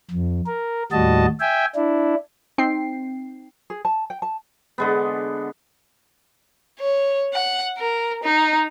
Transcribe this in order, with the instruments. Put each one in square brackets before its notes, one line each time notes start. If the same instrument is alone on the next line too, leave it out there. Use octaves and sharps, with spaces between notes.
[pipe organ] F2
A#4
D#2 A2 G3 F#4 D#5 A5
E5 G5 G#5
D4 E4
[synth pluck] C4 D#4 G5 C7
[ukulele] G#4
A5
G5
A5
[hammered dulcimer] D3 G#3 B3
[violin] C#5
F#5
A#4
D#4